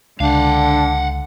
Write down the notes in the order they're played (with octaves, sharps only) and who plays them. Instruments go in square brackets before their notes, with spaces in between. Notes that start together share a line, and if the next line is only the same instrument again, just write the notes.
[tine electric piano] C#2 [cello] D3 [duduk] D4 [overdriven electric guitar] F5 F#5